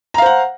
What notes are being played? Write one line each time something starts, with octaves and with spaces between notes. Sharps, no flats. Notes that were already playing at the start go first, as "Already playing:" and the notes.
C5 F5 F#5 A#5